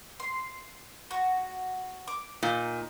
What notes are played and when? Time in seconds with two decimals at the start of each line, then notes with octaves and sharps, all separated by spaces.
0.20 C6
1.11 F#4
2.08 D6
2.43 A#2 D#4